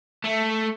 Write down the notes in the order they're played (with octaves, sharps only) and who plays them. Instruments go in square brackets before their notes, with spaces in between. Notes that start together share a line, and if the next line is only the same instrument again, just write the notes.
[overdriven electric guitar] A3